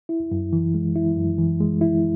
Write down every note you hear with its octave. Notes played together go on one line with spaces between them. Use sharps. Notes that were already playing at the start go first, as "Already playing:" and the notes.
E4
F#2
E3
G#3
E4
F#2
E3
G#3
E4